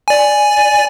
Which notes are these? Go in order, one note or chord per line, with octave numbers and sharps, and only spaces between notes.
D5 G#5